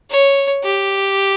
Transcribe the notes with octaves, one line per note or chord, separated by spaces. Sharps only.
C#5
G4